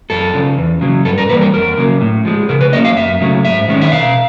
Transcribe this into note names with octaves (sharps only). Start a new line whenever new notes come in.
F#2 A4
C#3 F3
E2
C#3 F#3
G2 A4
A#4
E3 G3 A#3 B4
A#4
F2 A#4
C#3 F#3 A#3
A2
F3 G#3
C#3 A#4
B4
F#3 A#3 C#4 D#5
F5
F#2 E5
C#3 F#3 A3
G#2 E5
D#3 G#3 C#4
E5
B2 F5